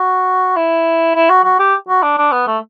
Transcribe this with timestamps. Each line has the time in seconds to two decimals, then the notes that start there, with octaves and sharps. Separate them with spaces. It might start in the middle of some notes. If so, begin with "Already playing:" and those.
Already playing: F#4
0.57 E4
1.15 E4
1.30 F#4
1.44 F#4
1.59 G4
1.89 F#4
2.03 D4
2.18 D4
2.32 B3
2.47 A3